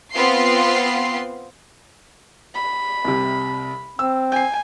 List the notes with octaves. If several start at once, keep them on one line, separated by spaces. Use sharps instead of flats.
B3 C4 F4 B4 C6 C7
B5
C2 C3
C4 E6
G#5 G6 C7